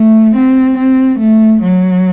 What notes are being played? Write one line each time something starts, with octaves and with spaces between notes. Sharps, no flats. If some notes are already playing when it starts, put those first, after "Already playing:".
Already playing: A3
C4
C4
A3
F#3